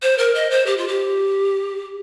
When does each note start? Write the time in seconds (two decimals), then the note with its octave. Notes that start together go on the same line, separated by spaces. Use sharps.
0.02 C5
0.18 A#4
0.35 D#5
0.51 C5
0.66 G4
0.77 F4
0.88 G4